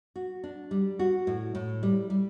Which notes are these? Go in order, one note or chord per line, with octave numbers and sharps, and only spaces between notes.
F#4
D4
G3
F#4
A2
A2
G3
G3